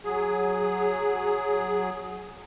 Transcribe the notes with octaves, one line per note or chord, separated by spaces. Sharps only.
F#3 G#4